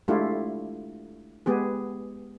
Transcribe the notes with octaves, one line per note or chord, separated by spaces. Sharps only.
G#3 A3 D4 E4 F4 G4
G#3 B3 G4 G#4